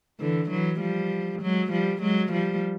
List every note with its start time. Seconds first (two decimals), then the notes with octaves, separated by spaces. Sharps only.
0.20 D3 E3
0.50 E3 F#3
0.80 F3 G3
1.42 F#3 G#3
1.71 F3 G3
2.02 F#3 G#3
2.32 F3 G3